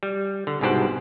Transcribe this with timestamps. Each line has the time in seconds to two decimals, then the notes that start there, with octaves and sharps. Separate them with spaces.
0.03 G3
0.47 D3
0.61 C2 G#2 B2 G4 C5 F#5